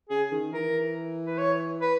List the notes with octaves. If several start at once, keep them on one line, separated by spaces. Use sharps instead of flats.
C#3 G#4
D#3
E3 A#4
B4
C#5
B4